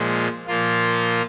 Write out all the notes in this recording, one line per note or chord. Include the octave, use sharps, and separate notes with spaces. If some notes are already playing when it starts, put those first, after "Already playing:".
Already playing: A#2 F3 G#3
A#2 F3 A#3 F4